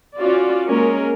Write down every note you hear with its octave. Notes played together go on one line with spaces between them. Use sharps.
C#4 F4 F#4 D5
G#3 A#3 C#4 A#4